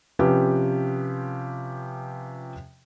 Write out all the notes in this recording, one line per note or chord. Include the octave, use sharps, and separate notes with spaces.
C3 F3 C#4 G4 B4